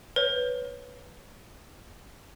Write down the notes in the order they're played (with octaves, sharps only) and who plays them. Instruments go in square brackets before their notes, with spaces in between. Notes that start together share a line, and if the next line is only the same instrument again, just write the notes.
[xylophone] B4 C#5